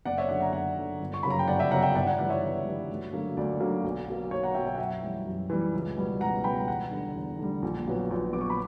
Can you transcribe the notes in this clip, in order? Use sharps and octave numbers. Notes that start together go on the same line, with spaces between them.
F#1 D5 F#5
C#5 E5
F#2 D3 D5 F#5
F#5 A#5
F#1 D5 F#5
F#2 D3
G1
C#6
F#2 C#3 F#3 A#3 B5
A#5
G5
G1 D5 F#5
E5 G5
F#2 C#3 F#3 A#3 F#5 A#5
E5 G5
G1 D5 F#5
D5 F#5
G2 E3 G3 D5 F#5
C#5 E5
G1
G2 E3 G3
D2
D3 F#3 A#3
D2 D5
D3 F#3 A#3
B1
B2 F#3 A#3
B1 C#5
F#5 A#5
B2 F#3 A#3 E5 G5
E5 G5
F#5
F#2 E5 G5
E3 G3
F#2
E3 G3
C#2
B2 G3 B3
C#2 F#5 A#5
B2 G3 B3 G5 B5
E2 F#5 A#5
D3 G3
E2
D3 G3
A#1
A#2 F#3 B3
A#1
A#2 F#3 B3 D6
C#6
B5